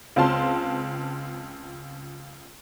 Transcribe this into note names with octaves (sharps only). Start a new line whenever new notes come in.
C#2 C4 F4 A5 C6